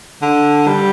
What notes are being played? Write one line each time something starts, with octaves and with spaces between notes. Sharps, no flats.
D3
G3